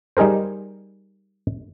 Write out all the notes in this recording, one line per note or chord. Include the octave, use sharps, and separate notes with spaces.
G3 D#4 G#4 A#4 C5